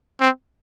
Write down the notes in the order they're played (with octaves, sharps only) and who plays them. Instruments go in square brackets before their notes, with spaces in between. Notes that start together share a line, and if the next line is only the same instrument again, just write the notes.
[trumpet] C4